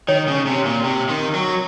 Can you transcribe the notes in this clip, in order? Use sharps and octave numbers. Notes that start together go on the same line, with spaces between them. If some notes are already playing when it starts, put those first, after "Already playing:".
D#3 C#5
C#3
C3
A#2
C3
D#3
F#3